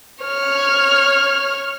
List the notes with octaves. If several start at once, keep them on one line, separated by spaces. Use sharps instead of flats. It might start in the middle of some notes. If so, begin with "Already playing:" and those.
C#5 F6